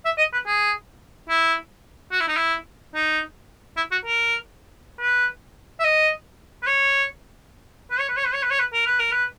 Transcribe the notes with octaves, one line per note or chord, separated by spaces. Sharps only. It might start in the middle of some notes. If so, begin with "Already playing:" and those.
E5
D#5
B4
G#4
E4
F#4
E4
D#4
E4
D#4
E4
F#4
A#4
B4
E5
D#5
B4
C#5
B4
C#5
B4
C#5
B4
C#5
B4
C#5
B4
A#4
B4
A#4
B4